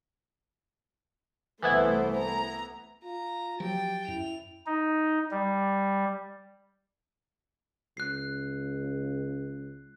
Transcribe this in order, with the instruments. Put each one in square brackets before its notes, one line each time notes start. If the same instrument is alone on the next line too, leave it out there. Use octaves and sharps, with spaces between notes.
[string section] C2 A3 C5 [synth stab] E3 B3 E4
[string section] A#5
[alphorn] F4 [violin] A#5
[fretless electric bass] F3 F#3 [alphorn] G4 [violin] G5 A6
[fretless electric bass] F#2 [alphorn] E4 [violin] F7
[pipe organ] D#4
G3
[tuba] C#2 [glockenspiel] F#6 C7